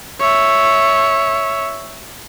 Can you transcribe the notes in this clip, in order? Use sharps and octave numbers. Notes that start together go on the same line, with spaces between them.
C#5 E5